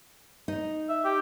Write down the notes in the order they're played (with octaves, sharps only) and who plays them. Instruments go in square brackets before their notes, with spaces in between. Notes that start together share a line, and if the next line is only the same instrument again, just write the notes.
[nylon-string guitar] D#4
[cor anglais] E5
G4